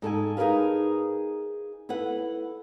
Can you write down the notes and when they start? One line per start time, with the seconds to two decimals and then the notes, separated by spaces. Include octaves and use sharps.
0.02 G#2 A4 B4 G#5
0.37 D#4 G#4 A#4 B4 F5
1.89 E4 A4 B4 F#5